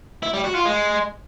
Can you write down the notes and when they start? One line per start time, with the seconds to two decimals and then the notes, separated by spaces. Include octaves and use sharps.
0.23 E4
0.33 G3
0.44 F#4
0.55 F4
0.65 G#3